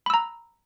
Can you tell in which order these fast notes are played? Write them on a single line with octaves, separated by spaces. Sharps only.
B5 E6 A#5